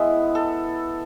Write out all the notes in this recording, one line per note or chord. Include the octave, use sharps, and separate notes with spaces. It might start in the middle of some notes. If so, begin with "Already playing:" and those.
Already playing: G#3 B3 E4
A4